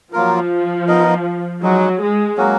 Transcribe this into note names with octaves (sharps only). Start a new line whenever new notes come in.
F3 F#3 A#3 F4 A#4
B3 D#4 A#4 D#5
F#3 G#3 D#4 F#4
G#3
F#3 A#3 C#4 F#4